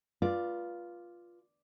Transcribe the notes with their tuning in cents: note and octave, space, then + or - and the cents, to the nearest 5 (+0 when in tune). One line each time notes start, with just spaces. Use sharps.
F4 +0 B4 -30 D5 +0